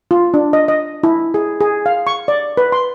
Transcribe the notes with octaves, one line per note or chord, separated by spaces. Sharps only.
F4
D4
D#5
D#5
E4
G#4
G#4
F5
C#6
D5
B4
C6